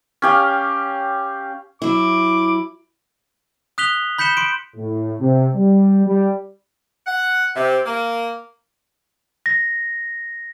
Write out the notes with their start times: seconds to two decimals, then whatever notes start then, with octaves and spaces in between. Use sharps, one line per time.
0.22 C#4 G4 F5
1.82 F#3 E4 D6
3.78 D#6 F#6 B6 F7 G7
4.18 B5 G6 B6 C#7 E7 G7
4.37 C6 D7
4.76 A2
5.19 C3
5.54 G3
6.07 G3
7.07 F#5
7.56 C3
7.86 A#3
9.46 A#6